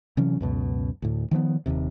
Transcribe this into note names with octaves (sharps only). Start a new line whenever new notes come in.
C3 E3 F#3 C#4
C#2 F#2 B2
D2 A2
D#3 F3 A#3 B3
D#1 G#1 D#2 C3